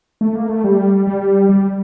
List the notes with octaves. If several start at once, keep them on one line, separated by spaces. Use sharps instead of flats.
A3
A#3
A3
G3
G3
G3